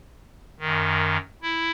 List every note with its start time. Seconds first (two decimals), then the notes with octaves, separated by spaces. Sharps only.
0.59 F#2 D#3
1.42 E4